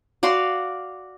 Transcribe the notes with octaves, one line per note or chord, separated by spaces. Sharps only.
F#4 D5 F5 C6